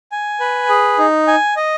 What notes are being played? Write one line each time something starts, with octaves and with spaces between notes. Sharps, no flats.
G#5
B4
G#4
D#4
G#5
D#5